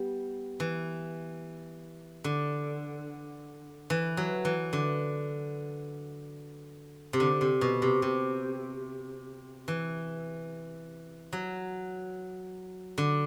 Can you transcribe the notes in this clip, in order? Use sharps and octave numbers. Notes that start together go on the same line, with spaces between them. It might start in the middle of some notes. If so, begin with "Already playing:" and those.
Already playing: G3 B3
E3
D3
E3
F#3
E3
D3
C3
D3
C3
B2
C3
C3
E3
F#3
D3